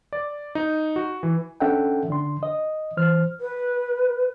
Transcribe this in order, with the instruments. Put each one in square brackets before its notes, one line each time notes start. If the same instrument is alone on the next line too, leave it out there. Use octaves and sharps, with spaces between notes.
[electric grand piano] D5
D#4
F#4
E3
[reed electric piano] C#4 D4 A4 E5 F#5 G5
D3 D4 C6
D#5
E3 C5 F6
[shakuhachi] B4